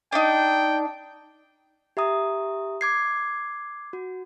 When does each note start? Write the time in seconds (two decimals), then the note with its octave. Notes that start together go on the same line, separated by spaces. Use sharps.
0.12 D4 D#4 G5
1.97 G4 E5 A#5 D#6
2.81 D6 G#6 C7
3.93 F#4